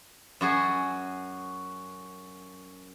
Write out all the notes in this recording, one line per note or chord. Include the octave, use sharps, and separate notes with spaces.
F#2 F#4 G#4